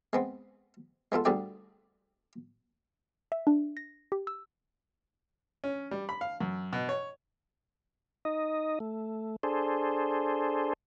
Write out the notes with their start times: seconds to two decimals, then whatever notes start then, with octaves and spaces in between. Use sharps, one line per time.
0.13 G#3 B3 C4
1.12 G#3 B3 F4 A4
1.25 D2 D3 G3 G#4 D5 G5
3.32 E5
3.47 D4
3.77 A#6
4.12 G4
4.27 E6
5.64 C#4
5.91 G3
6.09 B5
6.21 F5
6.41 F#2
6.73 B2
6.89 C#5
8.25 D#4 D#5
8.80 A3
9.43 D4 G#4 A4 C5